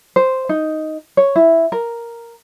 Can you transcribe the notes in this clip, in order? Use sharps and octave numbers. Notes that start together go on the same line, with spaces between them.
C5
D#4
C#5
E4
A#4